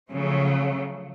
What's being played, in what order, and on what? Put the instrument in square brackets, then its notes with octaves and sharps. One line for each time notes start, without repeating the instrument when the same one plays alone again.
[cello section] C#3 F3 F#3 A3